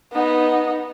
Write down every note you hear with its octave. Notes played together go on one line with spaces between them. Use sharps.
B3 D#4